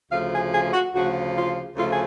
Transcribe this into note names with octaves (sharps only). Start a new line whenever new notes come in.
D2 C#3 F3 A3 F5
G#4
G#4
F#4
D2 C#3 F3 A3 F#4
F4
D2 C#3 F3 A3 F4
G#4